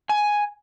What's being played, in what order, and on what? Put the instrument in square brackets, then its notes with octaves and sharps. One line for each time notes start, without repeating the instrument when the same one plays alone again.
[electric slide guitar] G#5